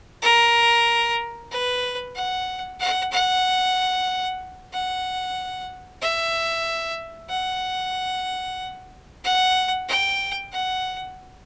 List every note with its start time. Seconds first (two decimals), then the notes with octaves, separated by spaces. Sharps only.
0.22 A#4
1.51 B4
2.15 F#5
2.80 F#5
3.12 F#5
4.73 F#5
6.01 E5
7.30 F#5
9.24 F#5
9.88 G5
10.52 F#5